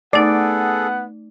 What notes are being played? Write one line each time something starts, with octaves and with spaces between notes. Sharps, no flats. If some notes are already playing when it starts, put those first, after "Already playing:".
A3 B3 D#4 G#4 A4 D5 F#5